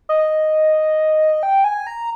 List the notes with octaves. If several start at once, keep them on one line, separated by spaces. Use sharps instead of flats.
D#5
G5
G#5
A#5